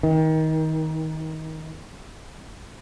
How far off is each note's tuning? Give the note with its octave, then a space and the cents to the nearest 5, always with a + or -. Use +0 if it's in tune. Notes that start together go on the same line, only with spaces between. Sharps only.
D#3 +25